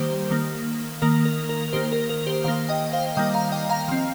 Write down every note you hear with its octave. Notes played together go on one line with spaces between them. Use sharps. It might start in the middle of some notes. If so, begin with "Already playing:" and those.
Already playing: D#3 G3 A#3 G4 C5
D#3 A#3
D#3 A#3 A#4
A#4
A#4
D#3 A#3 G4 C5
A#4
A#4
G4 C5
D#3 A#3 C5 F5
D#5 G5
C5 F5
D#3 G3 A#3 D#5 G5
F5 A#5
D#5 G5
F5 A#5
F3 C4